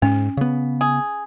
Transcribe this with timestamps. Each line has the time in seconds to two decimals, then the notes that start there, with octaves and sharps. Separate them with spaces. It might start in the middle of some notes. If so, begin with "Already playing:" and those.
0.02 G#2 C#4
0.37 C#3 B3
0.81 G#4